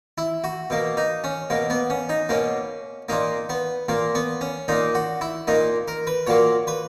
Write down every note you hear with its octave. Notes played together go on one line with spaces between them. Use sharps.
E4
F#4
B2 A#3
D#4
C#4
B2 A#3
B3
C#4
D#4
B2 A#3 C#4
A#2 A#3 D#4
B3
A#2 A#3
B3
C#4
A#2 A#3 D#4
F#4
E4
A#2 A#3 D#4
A#4
B4
A#2 F#3 A#3 C#5
B4